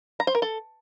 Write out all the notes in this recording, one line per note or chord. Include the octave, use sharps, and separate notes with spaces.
A#5
C5
A#4
A4